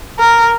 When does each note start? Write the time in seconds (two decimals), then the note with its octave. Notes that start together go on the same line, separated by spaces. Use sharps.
0.19 A#4